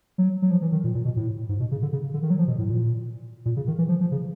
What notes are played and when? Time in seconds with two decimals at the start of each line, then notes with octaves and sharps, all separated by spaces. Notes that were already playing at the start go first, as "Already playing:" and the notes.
0.18 F#3
0.42 F#3
0.51 F3
0.62 E3
0.72 D#3
0.84 A#2
0.95 A#2
1.05 B2
1.16 A2
1.49 G#2
1.60 B2
1.71 C#3
1.82 D3
1.93 C#3
2.14 D3
2.23 D#3
2.30 F#3
2.38 F3
2.47 B2
2.58 A2
2.69 A#2
3.45 A#2
3.57 C#3
3.67 D#3
3.78 E3
3.89 F3
4.00 F3
4.11 C#3